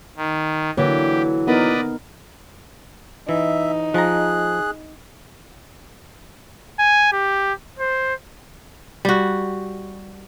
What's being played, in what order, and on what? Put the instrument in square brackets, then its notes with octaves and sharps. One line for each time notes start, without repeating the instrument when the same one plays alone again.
[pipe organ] D#3
[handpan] D3 A#3 [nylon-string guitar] E3 F#3 [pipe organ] G4
[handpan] B3 D#4 A#4 [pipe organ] B4 D5 D#5
[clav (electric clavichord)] E3 [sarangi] D#4 [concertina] E5
[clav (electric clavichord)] F3 A#5 [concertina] G#4 F#6
[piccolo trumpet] G#5
G4
C5
[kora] G3 F#4